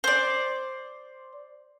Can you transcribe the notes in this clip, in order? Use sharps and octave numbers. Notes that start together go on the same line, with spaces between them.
C5 D5